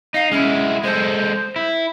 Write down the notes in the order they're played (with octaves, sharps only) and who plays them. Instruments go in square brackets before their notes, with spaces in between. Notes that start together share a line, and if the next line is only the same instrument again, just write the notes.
[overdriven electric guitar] D#4 [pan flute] F5
[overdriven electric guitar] G#3 E4 [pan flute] C#4
[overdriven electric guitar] G#3 A4 [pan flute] C5
[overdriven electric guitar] E4